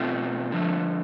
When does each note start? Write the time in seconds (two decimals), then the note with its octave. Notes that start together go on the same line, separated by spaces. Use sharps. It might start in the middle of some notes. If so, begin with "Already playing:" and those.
Already playing: B2 A3 C4 F4
0.52 D3 F3 A3